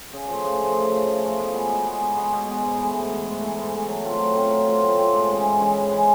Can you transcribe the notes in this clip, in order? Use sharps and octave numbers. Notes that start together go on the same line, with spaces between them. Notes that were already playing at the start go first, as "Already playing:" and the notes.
C#3
F3 A3
C#3
F3 A3
C#3
F3 A3
C#3
F3 A3
B2
G#3 B3
B2
G#3 B3
B2
G#3 B3
B2
G#3 B3
G#2
E3 A3
G#2
E3 A3
G#2
E3 A3
G#2
E3 A3
F#3
A3 C4 F4
F#3
A3 C4 F4
F#3
A3 C4 F4
F#3
A3 C4 F4
G#2
E3 G#3 C#4
G#2
E3 G#3 C#4
G#2
E3 G#3 C#4